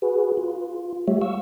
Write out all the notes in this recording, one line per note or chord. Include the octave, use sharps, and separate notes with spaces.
F#4 G#4 B4
F4
G3 A3 G4 C#5 E5
F5 C#6 E6